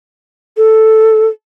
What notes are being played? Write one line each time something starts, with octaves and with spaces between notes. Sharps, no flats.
A4